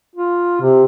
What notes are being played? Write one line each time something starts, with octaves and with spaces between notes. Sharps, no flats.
F4
C3